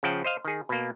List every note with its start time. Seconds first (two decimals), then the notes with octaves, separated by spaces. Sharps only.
0.03 C#3 F3 F#5 G5 A5
0.24 C5 D#5 F5
0.45 D#3 G#4
0.69 B2 A#3